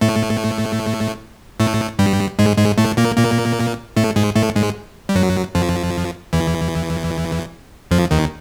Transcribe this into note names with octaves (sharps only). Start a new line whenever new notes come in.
A2 A3
A2 A3
G2 G3
G#2 G#3
G#2 G#3
A2 A3
A#2 A#3
A#2 A#3
A2 A3
G#2 G#3
A2 A3
G#2 G#3
G3
F#2 F#3
F2 F3
E2 E3
F2 F3
D#2 D#3